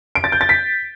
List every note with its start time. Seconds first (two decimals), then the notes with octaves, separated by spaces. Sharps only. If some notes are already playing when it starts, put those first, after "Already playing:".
0.15 D7
0.24 A6
0.32 G6
0.41 A6
0.49 B6